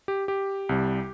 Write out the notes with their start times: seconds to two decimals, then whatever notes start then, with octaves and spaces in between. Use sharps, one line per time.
0.08 G4
0.28 G4
0.69 C2 C3 G3